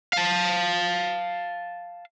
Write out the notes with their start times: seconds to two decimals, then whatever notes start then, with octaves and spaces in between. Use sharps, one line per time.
0.13 F5 A5